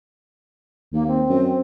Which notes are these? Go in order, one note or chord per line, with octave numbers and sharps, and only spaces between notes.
D#2 A#3
C4
F#2